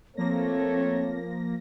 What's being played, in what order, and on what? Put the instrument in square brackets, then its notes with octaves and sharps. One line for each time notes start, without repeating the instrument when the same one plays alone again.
[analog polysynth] F3 A#3 A#6 [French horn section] A3 A4 C#5 [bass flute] C4